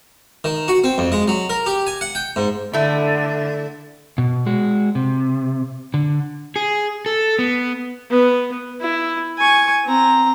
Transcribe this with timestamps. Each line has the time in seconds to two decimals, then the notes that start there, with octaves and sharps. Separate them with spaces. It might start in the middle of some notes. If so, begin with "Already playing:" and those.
0.44 D#3
0.68 F#4
0.84 C4
0.98 F2
1.12 G#3
1.28 F#3
1.50 A#4
1.66 G4
1.87 G#5
2.01 F#5
2.15 G5
2.36 G#2
2.73 D3 A3 E4
4.18 B2
4.46 G#3 F#4
4.95 C3
5.94 D3
6.56 G#4
7.06 A4
7.39 B3
8.10 B3
8.81 E4
9.38 G#5 C#6
9.85 C4 A#5